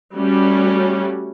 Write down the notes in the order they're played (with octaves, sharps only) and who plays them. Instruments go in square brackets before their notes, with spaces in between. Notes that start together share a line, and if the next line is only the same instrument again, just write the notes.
[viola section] G3 A3 C#4 F#4